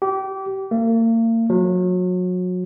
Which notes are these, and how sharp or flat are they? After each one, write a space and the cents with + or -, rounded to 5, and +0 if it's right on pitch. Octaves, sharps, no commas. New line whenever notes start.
G4 -25
A#3 -40
F#3 -30